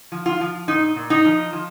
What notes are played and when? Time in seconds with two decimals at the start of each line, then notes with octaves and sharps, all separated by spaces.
0.12 F3
0.26 F4
0.41 F3
0.68 A#2 D#4
0.96 A#2
1.10 D#4
1.25 F3
1.53 F3